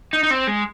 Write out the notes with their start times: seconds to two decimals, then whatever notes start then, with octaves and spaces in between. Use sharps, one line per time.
0.13 D#4
0.23 D#4
0.31 C4
0.47 G#3